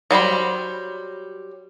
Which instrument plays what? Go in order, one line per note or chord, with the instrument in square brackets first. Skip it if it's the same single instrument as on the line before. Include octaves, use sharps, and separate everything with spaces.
[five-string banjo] F#3 G3 C5 B5